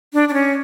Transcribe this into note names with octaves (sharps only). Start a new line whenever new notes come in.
D4
D4
C#4